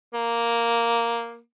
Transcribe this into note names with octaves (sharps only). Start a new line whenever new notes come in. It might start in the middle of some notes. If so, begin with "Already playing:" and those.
A#3